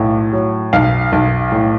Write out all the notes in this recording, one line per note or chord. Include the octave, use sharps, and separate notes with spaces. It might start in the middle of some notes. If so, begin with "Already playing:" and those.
Already playing: B1 A2
F#3
B1 F5
B1
A2